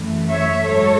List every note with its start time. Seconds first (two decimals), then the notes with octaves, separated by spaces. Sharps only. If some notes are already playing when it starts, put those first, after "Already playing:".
Already playing: F#2 E3 A3
0.28 C#5 E5
0.66 G#2 F#3 A3 A4 C#5